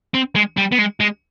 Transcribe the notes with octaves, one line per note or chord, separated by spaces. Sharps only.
C4
G#3
G3
B3
G#3
G#3